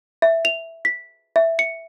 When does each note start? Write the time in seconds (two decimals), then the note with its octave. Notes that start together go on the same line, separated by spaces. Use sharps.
0.22 E5
0.45 F7
0.85 B6
1.36 E5
1.59 C#7